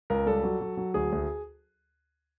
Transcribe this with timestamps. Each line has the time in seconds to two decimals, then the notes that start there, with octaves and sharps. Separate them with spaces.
0.10 C#2 A#4
0.26 G3 A4
0.43 F#3
0.61 F#3
0.77 F#3
0.94 D2 G#4
1.12 D2